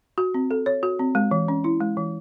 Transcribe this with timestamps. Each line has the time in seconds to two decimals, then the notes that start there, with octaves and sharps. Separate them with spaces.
0.18 F#4
0.34 C4
0.51 A4
0.66 C#5
0.83 F#4
0.99 C4
1.15 G#3
1.31 E3
1.48 C#4
1.64 E4
1.80 G#3
1.97 E3